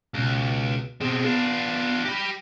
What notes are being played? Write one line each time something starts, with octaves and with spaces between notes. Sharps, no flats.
C#2 B2
B2 C4 G#4
B3 D4 F4
G4 B5 A#6